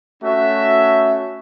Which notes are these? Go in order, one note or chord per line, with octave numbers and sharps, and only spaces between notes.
A3 C#4 F#4 E5